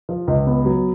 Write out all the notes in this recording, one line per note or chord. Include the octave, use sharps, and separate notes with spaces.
F3
C#2
B3
F#3